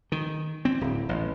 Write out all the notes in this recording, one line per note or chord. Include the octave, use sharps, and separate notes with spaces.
D#3
C4
D1
A1